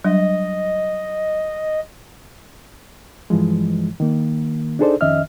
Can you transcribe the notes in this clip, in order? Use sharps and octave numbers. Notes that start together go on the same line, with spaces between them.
F#3 G3 D4 D#5
G2 E3 F3 G#3
D#3 A#3
D4 D#4 G#4 A4 C5 D5
F2 D#3 C#4 D#5 E5 F6